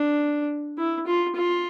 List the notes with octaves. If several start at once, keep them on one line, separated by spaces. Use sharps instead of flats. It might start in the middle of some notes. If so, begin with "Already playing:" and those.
Already playing: D4
E4
F4
F4